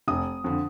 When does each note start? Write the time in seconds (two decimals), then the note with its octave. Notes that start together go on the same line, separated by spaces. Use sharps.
0.08 F1 D#6
0.44 F2 D3